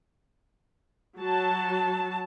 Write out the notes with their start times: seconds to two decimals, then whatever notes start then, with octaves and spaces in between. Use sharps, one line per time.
1.20 F#3 A5